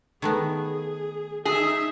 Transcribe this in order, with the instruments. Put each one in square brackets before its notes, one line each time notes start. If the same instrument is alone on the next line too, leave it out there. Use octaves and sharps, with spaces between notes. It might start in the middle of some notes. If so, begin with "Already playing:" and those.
[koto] D#3 A3 B3 [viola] G#4
[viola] D#4 E5 [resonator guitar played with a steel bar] G#4